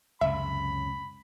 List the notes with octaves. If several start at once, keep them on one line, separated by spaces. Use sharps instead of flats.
C#2 F#2 C3 E5 B5